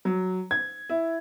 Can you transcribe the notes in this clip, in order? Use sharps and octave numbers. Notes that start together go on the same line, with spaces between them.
F#3
G#6
E4